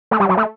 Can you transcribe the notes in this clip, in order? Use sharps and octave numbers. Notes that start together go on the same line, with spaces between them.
A3
G3
F#3
A3